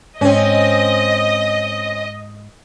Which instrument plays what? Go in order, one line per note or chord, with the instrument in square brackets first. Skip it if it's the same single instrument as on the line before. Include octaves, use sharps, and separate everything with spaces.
[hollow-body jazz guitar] G#2 [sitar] C4 C#4 [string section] D#5